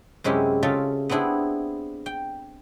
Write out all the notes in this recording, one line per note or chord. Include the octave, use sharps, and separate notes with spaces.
F#2 C3 G#3 C#4 E4 G4
C#3 F4 A4 E5
B3 C4 D4 E4 G#4
G5